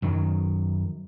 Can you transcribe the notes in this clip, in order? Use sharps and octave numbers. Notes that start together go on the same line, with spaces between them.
F#2 D#3 F#3